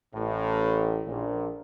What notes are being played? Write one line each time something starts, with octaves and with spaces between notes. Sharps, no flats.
A1 A2
A#1 A#2